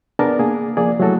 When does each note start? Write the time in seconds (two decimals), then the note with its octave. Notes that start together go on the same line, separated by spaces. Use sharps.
0.19 B3 D4 G#4 A#4 A5 D6
0.39 A#3 G#4
0.77 F3 A#3 G#4 D5
1.00 F#3 A3 E4 F#4 A4